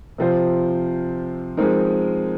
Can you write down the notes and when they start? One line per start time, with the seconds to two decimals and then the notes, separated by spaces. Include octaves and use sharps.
0.18 C3 F3 C4 F4 C5
1.57 F3 G#3 C4 D#4 A#4